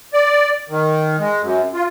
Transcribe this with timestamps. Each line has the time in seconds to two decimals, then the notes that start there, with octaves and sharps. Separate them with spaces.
0.14 D5
0.70 D#3
1.19 G#3
1.42 F#2
1.74 F4